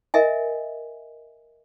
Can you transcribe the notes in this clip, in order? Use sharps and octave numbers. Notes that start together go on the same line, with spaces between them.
A#4 D#5 E5 G#5